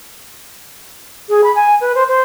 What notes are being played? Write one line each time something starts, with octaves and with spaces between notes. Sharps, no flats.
G#4
B5
G#5
B4
C5
C5